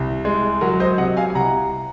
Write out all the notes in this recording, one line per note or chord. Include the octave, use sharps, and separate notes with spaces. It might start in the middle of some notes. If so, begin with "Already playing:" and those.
Already playing: C2
G#3
F#3 F#4 A#4
C5 D#5
C3 D#5 F#5
F5 G#5
G#5
C2 F#5 A#5